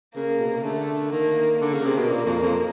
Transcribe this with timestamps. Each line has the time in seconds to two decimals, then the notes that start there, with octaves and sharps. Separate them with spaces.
0.15 C#3 A#3
0.39 B2
0.48 C3
0.56 C#3
0.64 D3 A3
1.12 D#3 A#3
1.61 D3 A#3
1.74 C#3
1.86 C3
1.97 B2
2.10 A#2
2.26 F2
2.42 F2